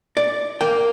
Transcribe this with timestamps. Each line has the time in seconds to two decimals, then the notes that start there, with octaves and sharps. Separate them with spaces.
0.17 D5
0.61 A#3 G5